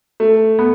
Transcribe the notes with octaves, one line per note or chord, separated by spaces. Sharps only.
A3
B3